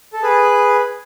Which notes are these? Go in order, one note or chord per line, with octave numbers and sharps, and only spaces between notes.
A4
G#4 B4